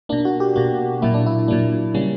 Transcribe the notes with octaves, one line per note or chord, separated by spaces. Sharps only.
B2 A#3 D4
F#4
G4
B2 A#3 F#4
A#2 F#3 A#3 E4
D4
E4
A#2 F#3 A#3 D4
C#3 G3 A#3 C#4